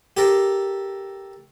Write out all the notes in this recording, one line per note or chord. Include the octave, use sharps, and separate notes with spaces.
G4 A4 A#4